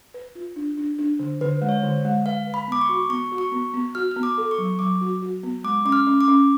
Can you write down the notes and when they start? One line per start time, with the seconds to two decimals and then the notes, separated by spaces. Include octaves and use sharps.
0.14 B4
0.35 F4
0.56 D4
0.78 D4
0.98 D4
1.19 D3
1.41 D3 B4
1.61 G#3
1.69 C#5
1.83 D3
2.05 G#3
2.26 B4 F5
2.47 B4
2.54 B5
2.68 B3 D6
2.82 C#6
2.89 F#4
3.10 B3 C#6
3.32 F#4
3.38 C#6
3.52 B3
3.74 B3
3.95 F#4 F6
4.11 B3 F6
4.23 D6
4.38 A4
4.51 C#6
4.58 F#3
4.79 F#3 D6
5.01 F#4
5.22 F#4
5.43 B3
5.64 G#3 D6
5.85 C#4 D6
5.92 F6
6.07 C#4
6.21 D6
6.28 C#4